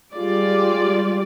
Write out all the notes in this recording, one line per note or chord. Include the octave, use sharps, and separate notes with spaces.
G3 G#3 F4 D5